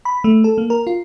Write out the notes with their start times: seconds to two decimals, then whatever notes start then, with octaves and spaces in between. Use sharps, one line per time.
0.05 B5
0.24 A3
0.44 A4
0.58 A#3
0.70 A#4
0.87 F4